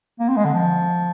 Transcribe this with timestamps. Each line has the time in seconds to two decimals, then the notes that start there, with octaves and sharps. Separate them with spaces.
0.20 A#3
0.29 C4
0.37 G#3
0.45 D3
0.54 F3